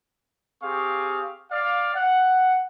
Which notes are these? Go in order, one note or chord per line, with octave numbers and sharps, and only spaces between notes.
C4 G4 G#4 F5 C#6
D5 F5
F#5